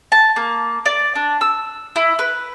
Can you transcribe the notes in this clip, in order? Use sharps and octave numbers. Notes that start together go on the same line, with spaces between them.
A5
A#3
D5
D4
E6
E4
B4